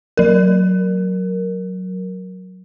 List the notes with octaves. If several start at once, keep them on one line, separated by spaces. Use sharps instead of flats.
F#3 A#4